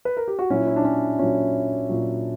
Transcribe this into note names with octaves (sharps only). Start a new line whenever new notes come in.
B4
A#4
G4
F#4
A#2 F#3 C#4 E4
E4
D4
C#4
A#2 F#3 C#4
A#2 F#3